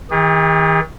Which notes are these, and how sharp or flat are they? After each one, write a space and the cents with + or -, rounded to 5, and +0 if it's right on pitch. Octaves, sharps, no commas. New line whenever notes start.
D#3 +40 G#4 -40